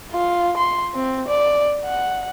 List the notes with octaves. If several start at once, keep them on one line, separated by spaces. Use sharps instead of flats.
F4
C6
C4
D5
F#5